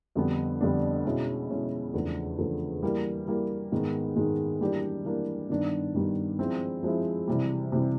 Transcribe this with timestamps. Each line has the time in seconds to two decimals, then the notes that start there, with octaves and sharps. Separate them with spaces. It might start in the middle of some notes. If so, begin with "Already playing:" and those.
0.15 F2 D3 G3 B3 D4
0.61 F2 D3 G3 B3 D4
1.04 B2 G#3 C#4 E4
1.49 B2 G#3 C#4 E4
1.93 E2 C#3 F3 A3 D4
2.38 E2 C#3 F3 A3 D4
2.82 E3 G3 A#3
3.27 E3 G3 A#3
3.72 G#2 D#3 G#3 B3
4.16 G#2 D#3 G#3 B3
4.60 E3 G3 A#3 D4 G4
5.05 E3 G3 A#3 D4 G4
5.50 G2 D#3 G3 B3 D4
5.94 G2 D#3 G3 B3 D4
6.39 F3 G#3 C4 E4
6.83 F3 G#3 C4 E4
7.28 C3 E3 G3
7.72 C3 E3 G3